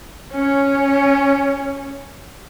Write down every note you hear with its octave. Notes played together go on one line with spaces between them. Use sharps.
C#4 C#5